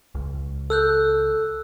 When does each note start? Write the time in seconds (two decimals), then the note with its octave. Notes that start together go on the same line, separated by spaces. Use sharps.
0.15 C#2
0.70 A4 E6 F#6 G6